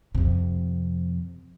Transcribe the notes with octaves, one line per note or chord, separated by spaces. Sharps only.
F2 C3